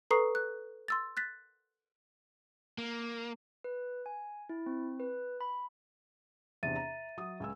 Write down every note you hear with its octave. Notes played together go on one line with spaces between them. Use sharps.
A4 B4 A#5 C#6 D#6 C7
F#6
C6 E6 A6
F#6 A6 B6
A#3
B4
G#5
E4
C4
B4
B5
E2 C3 D4 E5 A6 D#7
A#5
F#3 D#6
C#2 G#5 E6